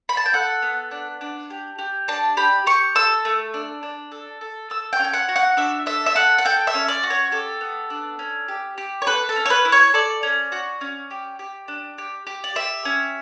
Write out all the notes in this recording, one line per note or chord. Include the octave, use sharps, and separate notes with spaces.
B5
A5
G5
A4 F#5
B3
D4
D4
G4
G4
D4 A5
G4 B5
G4 C#6
A4 E6
A3
D4
D4
A4
A4
A4 E6
G5
C#4
G5
F#5
F#4
F#5
D4 E5
A4 E5
E5
A4 F#5
F#5
A4 G5
E5
C#4
D5
F#4
C#5
G4 A4
B3
D4
C#4
G4
G4
C#5
A4 B4
A4
C#4
C#5
B4
E4
C#5
A4 D5
C#4
F#4
C#4
G4
G4
D4
G4
G4
D5
G4 E5
C#4